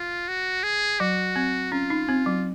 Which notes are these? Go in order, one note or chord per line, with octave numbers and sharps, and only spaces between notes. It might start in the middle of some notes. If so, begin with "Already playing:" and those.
Already playing: F4
F#4
G#4
F#3 F#4
C4
C#4 F4
D#4
C4
F#3